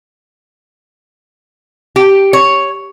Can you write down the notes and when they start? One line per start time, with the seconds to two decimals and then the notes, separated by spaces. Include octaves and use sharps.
1.96 G4
2.33 C#5